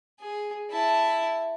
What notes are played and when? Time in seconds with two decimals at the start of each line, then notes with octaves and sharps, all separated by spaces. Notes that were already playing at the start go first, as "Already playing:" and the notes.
0.20 G#4
0.70 E4 A5